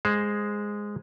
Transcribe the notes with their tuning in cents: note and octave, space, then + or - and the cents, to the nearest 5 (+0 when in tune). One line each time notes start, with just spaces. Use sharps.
G#3 -5 C5 +0